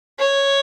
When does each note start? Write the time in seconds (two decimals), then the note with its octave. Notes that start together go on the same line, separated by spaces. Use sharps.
0.19 C#5